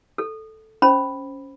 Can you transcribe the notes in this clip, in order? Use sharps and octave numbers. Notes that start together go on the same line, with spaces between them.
A4
C#4 C5 B5